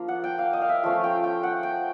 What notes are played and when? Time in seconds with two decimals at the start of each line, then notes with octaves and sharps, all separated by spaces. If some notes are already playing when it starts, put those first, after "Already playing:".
Already playing: F3 A#3 D4
0.08 F#5
0.24 G5
0.39 F5
0.53 D#5
0.62 F5
0.69 E5
0.83 F3 A3 C#4 F5
1.04 G5
1.24 G5
1.43 F#5
1.63 G5